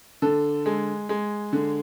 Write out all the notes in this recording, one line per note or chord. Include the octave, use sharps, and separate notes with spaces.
D3 A4
G#3
G#3
D3